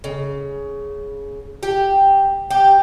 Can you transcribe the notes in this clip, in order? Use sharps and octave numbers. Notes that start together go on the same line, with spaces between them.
C#3
G4
G4